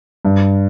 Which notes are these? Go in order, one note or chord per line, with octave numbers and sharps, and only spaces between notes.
G2